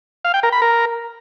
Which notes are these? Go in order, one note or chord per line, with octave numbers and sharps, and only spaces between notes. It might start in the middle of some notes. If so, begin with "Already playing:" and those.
F5
G5
A#4
B5
A#4